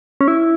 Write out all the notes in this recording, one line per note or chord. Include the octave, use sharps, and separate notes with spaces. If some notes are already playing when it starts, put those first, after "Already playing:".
C#4
E4